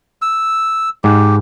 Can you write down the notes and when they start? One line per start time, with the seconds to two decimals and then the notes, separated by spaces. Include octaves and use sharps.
0.22 E6
1.04 G#2 G4